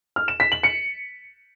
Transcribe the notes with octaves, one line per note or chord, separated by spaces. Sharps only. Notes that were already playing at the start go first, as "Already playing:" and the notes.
F6
E7
B6
F#7
C#7